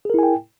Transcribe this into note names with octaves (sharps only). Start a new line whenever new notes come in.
E4 G#4 A#4 G5 G#5